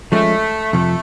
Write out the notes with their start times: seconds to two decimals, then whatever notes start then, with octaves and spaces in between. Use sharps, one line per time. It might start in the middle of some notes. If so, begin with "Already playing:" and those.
0.12 F3 G#3 A3 C#4
0.73 F2 C3 F3 A3